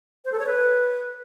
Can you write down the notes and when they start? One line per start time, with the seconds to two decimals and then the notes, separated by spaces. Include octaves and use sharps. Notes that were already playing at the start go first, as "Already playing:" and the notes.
0.25 C5
0.32 A4
0.39 C#5
0.46 B4